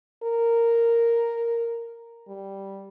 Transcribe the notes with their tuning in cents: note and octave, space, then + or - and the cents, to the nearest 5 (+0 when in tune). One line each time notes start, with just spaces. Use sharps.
A#4 -5
G3 -5